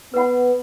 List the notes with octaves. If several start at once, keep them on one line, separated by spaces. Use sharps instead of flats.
B3 B4 F#5 B5